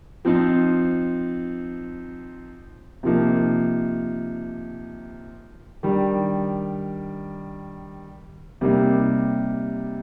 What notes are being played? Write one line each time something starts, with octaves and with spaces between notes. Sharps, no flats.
F3 C4 D#4
C3 F3 A#3 D#4
D#3 G3 D4
C3 G3 A#3 D#4